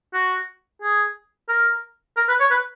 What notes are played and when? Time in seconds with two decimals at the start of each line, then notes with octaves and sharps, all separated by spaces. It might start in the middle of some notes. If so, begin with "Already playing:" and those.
0.13 F#4
0.82 G#4
1.49 A#4
2.17 A#4
2.29 B4
2.40 C#5
2.51 B4